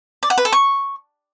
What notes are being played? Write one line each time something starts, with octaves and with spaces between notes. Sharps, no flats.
D5
F#5
B4
A4
C#6